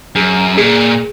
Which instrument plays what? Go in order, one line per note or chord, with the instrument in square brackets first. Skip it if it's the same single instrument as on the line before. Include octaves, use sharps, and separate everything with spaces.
[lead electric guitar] F#2 [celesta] G#4
[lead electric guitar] A#2 [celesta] G#4